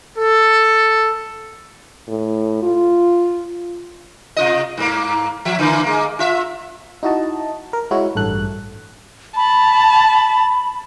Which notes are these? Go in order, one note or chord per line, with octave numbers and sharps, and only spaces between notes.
A4
A2
F4
C3 F4 D#5
G#2 A#3
F3 E5
D3 E3 A#3
G#3 A#3
F4 E5
D#4 E4 F#4 D#5 A5
A#4
G#3 E4 F#4 C#5
A1 G2 A4 F#6
A5 B5